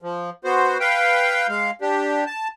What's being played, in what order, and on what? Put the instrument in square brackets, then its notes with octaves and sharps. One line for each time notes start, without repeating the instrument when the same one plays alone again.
[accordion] F3
B3 F#4 C5
B4 F5 G5
G#3 F5
D4 G4
A5